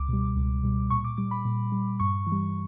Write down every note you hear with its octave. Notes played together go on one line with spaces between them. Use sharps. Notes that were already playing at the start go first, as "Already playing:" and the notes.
Already playing: C#2 D6
B2 G3
C#2
B2 G3
A#2 C#6
D6
G3 D6
B5
A#2
G3
G2 C#6
E3
G3